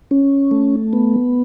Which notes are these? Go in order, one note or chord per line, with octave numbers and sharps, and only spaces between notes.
C#4
A3
B3